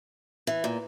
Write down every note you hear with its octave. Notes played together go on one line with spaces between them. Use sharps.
E3
A#2